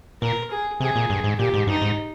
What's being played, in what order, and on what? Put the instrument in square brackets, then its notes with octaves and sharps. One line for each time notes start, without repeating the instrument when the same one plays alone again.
[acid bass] A#2 [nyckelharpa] A#4
[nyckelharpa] G#4
[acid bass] C3 [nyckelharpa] G#4
[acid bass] A#2
G2
G#2
[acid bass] A#2 [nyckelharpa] G4
[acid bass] G#2
[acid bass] G2 [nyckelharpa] D#4
[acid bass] G#2